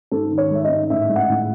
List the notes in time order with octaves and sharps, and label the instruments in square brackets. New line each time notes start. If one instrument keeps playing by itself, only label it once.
[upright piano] G#2 A4
D#3
C#5
G#3 E5
D#5
G#2
A2 E5
G#3
F#5
A2